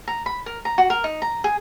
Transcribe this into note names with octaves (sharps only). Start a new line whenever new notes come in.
A#5
B5
A#4
A#5
F#4
A#4
D#4
A#5
G#4